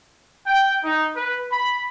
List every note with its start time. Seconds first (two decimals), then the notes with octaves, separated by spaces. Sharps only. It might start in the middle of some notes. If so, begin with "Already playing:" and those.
0.46 G5
0.85 D#4
1.16 B4
1.52 B5